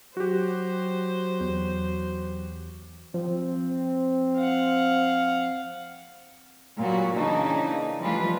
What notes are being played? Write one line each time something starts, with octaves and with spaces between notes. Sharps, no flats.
F#3 F#4 G4 C5
E2
F3 C4
F5 F#5
A#2 F#3 G3 F#4
C#3 E3 A#3 D4 D#4
E3 F3 G3 A3 F4 B4